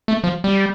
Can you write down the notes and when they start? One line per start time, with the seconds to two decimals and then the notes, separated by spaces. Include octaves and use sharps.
0.08 A3
0.24 F3
0.44 G3